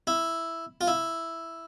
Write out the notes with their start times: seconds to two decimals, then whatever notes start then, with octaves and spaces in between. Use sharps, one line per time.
0.07 E4
0.81 F4
0.88 E4